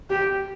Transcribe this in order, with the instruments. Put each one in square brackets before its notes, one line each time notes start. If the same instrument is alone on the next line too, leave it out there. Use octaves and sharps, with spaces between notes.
[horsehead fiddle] G4